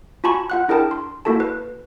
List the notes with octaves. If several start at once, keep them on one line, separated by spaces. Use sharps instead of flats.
F4 F#4 G#5 A5 B5 C#6
F4 F#5 F#6
D4 E4 G#4 A#4 G5 A5
C6
A#3 E4 F#4 A4 A5
B4